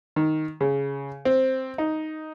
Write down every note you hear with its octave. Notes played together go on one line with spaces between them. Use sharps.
D#3
C#3
C4
D#4